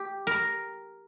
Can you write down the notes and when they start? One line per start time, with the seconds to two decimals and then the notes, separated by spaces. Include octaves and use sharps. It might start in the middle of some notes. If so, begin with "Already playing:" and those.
Already playing: G4
0.27 A#4